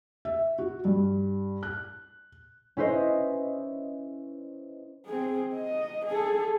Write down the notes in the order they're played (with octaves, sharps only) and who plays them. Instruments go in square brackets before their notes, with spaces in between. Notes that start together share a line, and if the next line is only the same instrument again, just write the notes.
[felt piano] E5
F#4
G2
F#6
[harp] C#4 E4 B4 C5 D#5
[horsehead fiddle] C4 G#4
D#5
G#4 A4